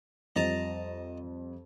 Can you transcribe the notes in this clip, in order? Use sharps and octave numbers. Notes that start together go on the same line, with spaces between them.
F2 G3 D#5 A5 A#5